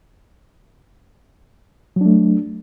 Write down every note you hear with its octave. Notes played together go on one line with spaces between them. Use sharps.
F#3 A3 D4